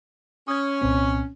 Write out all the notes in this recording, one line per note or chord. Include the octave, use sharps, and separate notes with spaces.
C#4 D#6 G#6
C2 A#2 C4